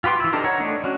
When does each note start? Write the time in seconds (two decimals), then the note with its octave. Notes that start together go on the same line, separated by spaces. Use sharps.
0.04 F4 G4 B4 C6 D6
0.20 E3 E4
0.33 D4 D#4 G4 A4 A#4
0.44 A#4 C#5 F#5
0.60 A3 D4 D#4
0.84 C#4 D4 F#4